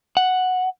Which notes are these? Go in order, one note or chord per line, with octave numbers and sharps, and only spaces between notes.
F#5